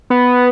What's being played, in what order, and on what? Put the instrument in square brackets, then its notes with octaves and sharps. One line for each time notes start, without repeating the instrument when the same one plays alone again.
[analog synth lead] B3